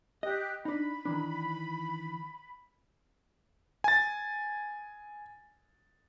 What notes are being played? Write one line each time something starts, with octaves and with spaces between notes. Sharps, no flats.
G4 D#5 F#6
D4 D#4 B5
D#3 E3 D4
G#5 A6